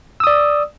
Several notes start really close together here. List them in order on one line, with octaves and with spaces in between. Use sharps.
E6 D#6 D5